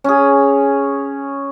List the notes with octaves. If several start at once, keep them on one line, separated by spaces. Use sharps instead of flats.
C#4 G#4